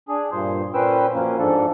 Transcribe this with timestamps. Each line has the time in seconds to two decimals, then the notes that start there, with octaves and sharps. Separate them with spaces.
0.09 D4 G#4
0.32 G2 A#2 C5
0.74 A#2 C#4 B4 C5 G5 E6
1.14 F#2 F3 A#3 C#4
1.39 G#2 F3 D4 A4